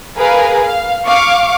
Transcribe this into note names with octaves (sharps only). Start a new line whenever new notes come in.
G#4 A#4 B4 F5
F5
F5 C#6 D6